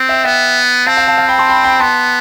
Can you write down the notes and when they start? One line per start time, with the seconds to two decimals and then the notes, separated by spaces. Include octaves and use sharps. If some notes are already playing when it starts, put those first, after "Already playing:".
Already playing: C4
0.09 E5 G5
0.24 B3 E5 G5
0.87 C4 F5 A5
0.97 F5 A5
1.07 F5 A5
1.18 F5 A5
1.28 G5 B5
1.38 A5 C6
1.49 G5 B5
1.64 G5 B5
1.80 B3 A5 C6